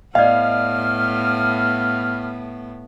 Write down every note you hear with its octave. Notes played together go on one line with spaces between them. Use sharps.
A2 B3 D5 D#5 F5 F6